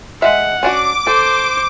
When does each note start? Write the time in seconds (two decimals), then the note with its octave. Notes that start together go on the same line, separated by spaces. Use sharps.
0.22 G#3 E5 F#5
0.63 C#4 D4 F#4 D6
1.07 A4 C5